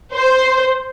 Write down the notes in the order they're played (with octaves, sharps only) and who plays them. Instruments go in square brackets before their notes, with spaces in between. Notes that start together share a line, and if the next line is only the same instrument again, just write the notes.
[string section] C5